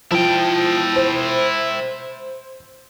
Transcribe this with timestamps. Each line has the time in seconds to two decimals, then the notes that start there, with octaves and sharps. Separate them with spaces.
0.11 F3 E4 G5
0.96 C5